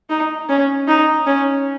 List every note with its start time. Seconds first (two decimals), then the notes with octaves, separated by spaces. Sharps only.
0.10 D#4
0.49 C#4
0.88 D#4
1.26 C#4